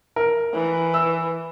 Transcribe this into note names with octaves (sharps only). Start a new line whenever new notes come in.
A#4
E3
E6